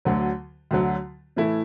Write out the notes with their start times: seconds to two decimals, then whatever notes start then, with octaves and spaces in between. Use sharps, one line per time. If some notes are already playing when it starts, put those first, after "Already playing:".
0.05 D2 D3 F#3
0.71 D2 D3 F#3
1.36 A2 E3 A3 E4